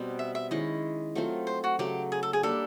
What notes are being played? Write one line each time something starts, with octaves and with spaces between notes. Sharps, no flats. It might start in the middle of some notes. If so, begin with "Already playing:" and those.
Already playing: B2 G3 C4
E5
E5
D#3 G#3 C#4 E4 D#5
F#3 A3 C4 F4
C5
F#4
C#3 F#3 A3 G4
G#4
A4
G#4
G3 A#3 D4 G4 A4